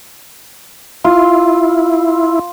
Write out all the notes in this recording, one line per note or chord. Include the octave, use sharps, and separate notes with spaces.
E4 F4